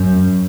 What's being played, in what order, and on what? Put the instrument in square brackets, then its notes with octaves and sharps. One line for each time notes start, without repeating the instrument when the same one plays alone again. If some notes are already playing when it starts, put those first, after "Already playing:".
Already playing: [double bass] F#2